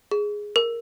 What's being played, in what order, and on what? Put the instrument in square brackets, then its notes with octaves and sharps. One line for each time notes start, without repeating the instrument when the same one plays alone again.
[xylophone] G#4
A#4